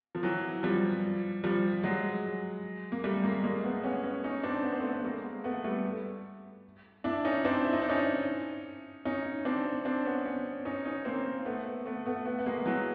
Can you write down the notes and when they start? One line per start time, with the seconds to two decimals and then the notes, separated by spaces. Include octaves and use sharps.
0.15 F3
0.23 E3 F#3
0.63 F3 G3
1.44 F3 G3
1.83 F#3 G#3
2.92 A#3
3.04 G3 A3
3.23 G#3 A#3
3.44 G#3 A#3
3.64 A3 B3
3.84 B3 C#4
4.04 B3 C#4
4.24 C#4 D#4
4.43 C4 D4
4.64 B3
4.72 C4
4.80 A3 B3
4.93 B3
5.04 G#3 A#3
5.44 A3 B3
5.64 G3 A3
7.04 D4 E4
7.25 C#4 D#4
7.45 C4 D4
7.65 E4
7.73 D#4
7.82 D4
7.89 C#4 D#4
9.05 C#4 D#4
9.45 C4 D4
9.85 C4 D4
10.05 B3 C#4
10.25 B3 C#4
10.65 C#4 D#4
10.85 C#4 D#4
11.05 A#3 C4
11.45 A3 B3
11.85 A3 B3
12.06 A3 B3
12.25 A3 B3
12.39 B3
12.46 G#3 A#3
12.66 E3 F#3